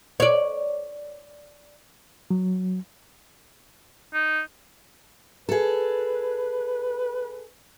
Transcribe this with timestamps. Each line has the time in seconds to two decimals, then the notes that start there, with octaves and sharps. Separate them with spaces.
0.20 C#5 D5
2.31 F#3
4.14 D#4
5.49 G#4 A4 B4